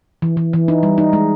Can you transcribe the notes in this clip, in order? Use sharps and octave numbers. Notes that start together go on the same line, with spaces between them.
E3
E3
E3
D#4
G3
D#4
G#3